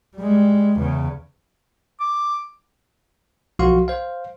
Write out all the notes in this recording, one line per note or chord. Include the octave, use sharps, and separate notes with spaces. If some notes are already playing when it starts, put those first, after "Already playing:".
G3 G#3
E2 C#3
D6
B1 F3 F#4 F5 C6
C5 F5